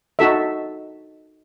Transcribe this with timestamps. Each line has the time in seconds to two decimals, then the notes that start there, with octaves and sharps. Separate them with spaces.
0.19 D#4 F#4 A4 E5